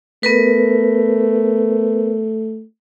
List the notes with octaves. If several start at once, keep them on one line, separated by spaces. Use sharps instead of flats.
A3 B3 A#4 B4